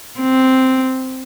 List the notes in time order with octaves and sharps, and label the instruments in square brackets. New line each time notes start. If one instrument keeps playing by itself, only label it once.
[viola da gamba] C4